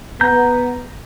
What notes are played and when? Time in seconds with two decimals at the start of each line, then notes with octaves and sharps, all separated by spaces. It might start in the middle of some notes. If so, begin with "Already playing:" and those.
0.21 B3 A#5 G6